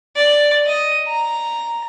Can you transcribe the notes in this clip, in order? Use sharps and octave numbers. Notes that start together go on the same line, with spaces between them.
D5
D#5
A#5